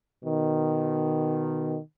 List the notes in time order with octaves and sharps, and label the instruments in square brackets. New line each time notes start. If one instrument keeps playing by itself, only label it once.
[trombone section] B2 D#3